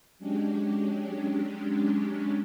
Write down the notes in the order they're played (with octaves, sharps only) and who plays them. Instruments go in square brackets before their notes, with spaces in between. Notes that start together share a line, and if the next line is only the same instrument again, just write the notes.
[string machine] F#3 G#3 C#4 D4 G4